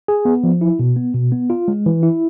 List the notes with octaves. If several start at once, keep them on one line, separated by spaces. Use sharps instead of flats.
G#4
B3
F3
E4
B2
B3
B2
B3
F4
G#3
E3
E4